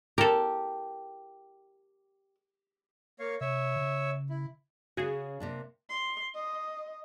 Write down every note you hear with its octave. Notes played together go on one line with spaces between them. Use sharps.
G4 A4 A#4
A#3 C#5 F5
C3 C#5 E5
C#3
E4
C#3 C#4 F#4 G#4
C3 A#3 D4
C6
D#5